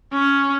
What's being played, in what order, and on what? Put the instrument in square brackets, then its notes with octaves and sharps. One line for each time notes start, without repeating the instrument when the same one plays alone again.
[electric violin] C#4